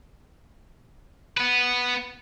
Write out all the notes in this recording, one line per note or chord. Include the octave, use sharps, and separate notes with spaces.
B3 B4